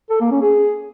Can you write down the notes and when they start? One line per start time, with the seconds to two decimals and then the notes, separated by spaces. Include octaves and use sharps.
0.10 A4
0.21 A#3
0.31 C#4
0.42 G#4